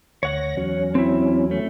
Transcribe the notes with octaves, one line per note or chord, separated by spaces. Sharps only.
D2 C#5 F#5 A#6
E2 F#3 C#4
C4 E4
A3